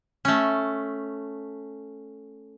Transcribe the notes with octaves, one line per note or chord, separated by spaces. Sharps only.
A3 C#4